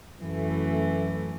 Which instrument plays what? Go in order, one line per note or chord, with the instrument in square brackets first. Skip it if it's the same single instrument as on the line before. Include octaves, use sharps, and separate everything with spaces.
[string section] F#2 E3 A3